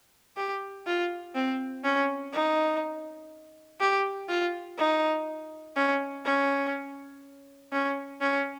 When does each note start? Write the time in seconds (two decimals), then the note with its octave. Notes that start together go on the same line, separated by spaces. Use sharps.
0.37 G4
0.86 F4
1.35 C4
1.84 C#4
2.33 D#4
3.80 G4
4.29 F4
4.78 D#4
5.76 C#4
6.25 C#4
7.72 C#4
8.21 C#4